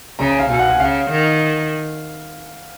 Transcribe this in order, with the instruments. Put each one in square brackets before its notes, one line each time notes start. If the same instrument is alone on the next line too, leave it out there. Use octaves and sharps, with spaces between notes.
[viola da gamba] C#3 [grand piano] A#5
[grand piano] G#5
F5
[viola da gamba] B2 [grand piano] G#5
[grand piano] F#5
G#5
[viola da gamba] C#3 [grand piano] F5
[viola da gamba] D#3